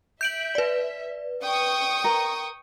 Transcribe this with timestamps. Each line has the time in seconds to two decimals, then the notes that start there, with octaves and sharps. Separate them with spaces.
0.21 E5 G6 D7 F#7
0.55 B4 D5
1.43 G5 C#6 D#6
2.04 A#4